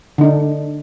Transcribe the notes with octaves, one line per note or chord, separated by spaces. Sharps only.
D3 D4 D#4